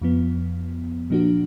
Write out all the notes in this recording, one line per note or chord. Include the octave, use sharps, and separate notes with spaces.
F2 F3 B3
A#2 F3 A#3 D4 F#4